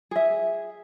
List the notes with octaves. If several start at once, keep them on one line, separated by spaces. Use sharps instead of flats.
G#4 E5